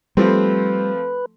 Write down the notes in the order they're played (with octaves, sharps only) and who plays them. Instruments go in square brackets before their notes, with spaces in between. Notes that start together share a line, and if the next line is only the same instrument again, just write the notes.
[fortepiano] F3 A3 C4 [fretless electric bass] G3 [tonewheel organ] B4